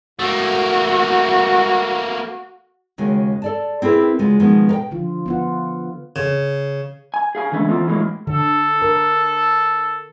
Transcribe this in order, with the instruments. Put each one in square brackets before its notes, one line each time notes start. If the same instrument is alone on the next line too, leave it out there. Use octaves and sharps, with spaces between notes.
[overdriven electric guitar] A3 A#3 [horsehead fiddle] F#4
[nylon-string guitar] D#2 C#3 G#3 F#4
A4 D5 A5
C4 E4 G#4 A#4 B4
C#3 G#3 F4 F#4
B2 D#3 F3 G#3 B3
A#4 G5
[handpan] D3 F3 F4
B3 F4 F#5
[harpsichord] C#3
[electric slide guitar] G#5
G#4 F5 G#5
D3 E3 G#3 A3 C#4
E3 B3 C4 F4 A4
A2 E3 F#3 G#3 A#3
[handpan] D3 [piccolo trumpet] A4
[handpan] A#4